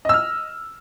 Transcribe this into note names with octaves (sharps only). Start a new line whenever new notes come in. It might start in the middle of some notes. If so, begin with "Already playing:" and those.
D#5 E6 F6